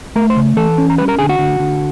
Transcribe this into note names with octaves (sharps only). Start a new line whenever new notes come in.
A3 A#4 A#5
C5 C6
C#3
E3 A4 A5
C#4
A#5
G3 B4 B5
A#4 A#5
D3 G#4 G#5
F#4 F#5
D3
D3